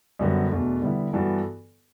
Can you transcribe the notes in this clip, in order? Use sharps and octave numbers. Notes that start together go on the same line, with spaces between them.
F#2 D3 G3 B3 F#4
E2 B2 A3 D4
D3 G3 B3 E4
G2 E3 B3 F#4 A4